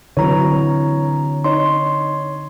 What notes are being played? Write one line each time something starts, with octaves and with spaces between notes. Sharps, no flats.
D3 E3 F#3 C4 C#5 A#5
D#4 C#5 C6